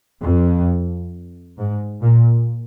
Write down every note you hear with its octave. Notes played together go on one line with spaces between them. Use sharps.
F2
G#2
A#2